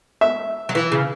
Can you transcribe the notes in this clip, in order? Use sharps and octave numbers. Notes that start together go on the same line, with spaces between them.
E5
F#3
E3
C#3